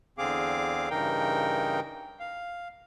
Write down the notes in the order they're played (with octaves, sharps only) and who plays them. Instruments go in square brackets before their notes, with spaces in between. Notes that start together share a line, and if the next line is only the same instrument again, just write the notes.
[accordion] E2 D3 C4 G#4 F5 D6
G2 C#3 E3 D#4 A#4 G5
F5